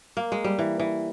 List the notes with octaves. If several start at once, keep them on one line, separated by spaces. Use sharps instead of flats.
A#3
G#3
G3
E3
E3